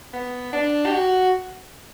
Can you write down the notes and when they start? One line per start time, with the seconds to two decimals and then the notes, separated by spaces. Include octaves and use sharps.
0.14 B3
0.53 D4
0.86 G4
0.92 F#4